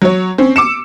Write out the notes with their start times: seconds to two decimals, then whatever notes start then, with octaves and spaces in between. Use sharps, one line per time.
0.02 F#3 C#5
0.38 C4 C#4
0.56 D6 E6 C#7 E7